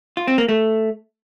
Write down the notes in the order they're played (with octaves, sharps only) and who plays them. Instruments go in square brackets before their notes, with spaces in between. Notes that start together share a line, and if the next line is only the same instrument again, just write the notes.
[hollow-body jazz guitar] F4
C4
A#3
A3